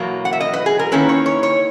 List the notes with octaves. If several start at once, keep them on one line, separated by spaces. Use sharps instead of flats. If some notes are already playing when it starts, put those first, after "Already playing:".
Already playing: E2 B2 F#3 A#3
F#5
E5
D#5
B4
G#4
A#4
D#3 A#3 C#4 E4 B4
C#5
C#5
C#5